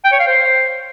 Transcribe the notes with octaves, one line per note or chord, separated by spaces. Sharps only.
G5
C#5
F5
C5